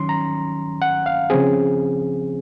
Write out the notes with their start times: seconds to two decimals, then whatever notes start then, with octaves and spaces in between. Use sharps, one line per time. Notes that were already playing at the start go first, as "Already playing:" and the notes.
Already playing: D#3 F#3 C#4 C6
0.09 A#5
0.82 F#5
1.06 F5
1.30 C#3 F3 C4 G#4